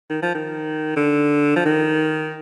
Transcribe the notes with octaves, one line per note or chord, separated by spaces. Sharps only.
D#3
F3
D#3
D3
F3
D#3